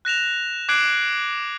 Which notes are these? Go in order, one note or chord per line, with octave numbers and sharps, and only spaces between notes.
F#6 A#6 E7 F7
D6 F#6 G#6 C7 D7 F#7